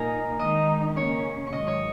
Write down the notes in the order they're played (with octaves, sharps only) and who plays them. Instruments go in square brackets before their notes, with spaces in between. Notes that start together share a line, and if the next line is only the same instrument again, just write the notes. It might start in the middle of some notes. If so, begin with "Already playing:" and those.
Already playing: [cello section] A#2 A#3 D#4 [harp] A#4 G#5 A#5
[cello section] D#3 G#3 D#4 [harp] D#5 D#6
[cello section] C#3 A#3 C#4 [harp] C#5 C#6
[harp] C#6
[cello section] G#2 D#3 F#3 [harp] D#5 D#6
[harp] C#5 C#6